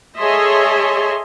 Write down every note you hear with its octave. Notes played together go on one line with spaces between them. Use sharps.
G#4 A4 C#5 D#5 E5 C6